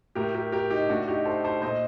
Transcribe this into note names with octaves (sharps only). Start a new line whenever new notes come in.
A2 G4 A#4
G4 A#4
G4 A#4
D#4 G4
A2 D4 F#4
D#4 G4
A4 C5
A4 C5
A#2 C5 D#5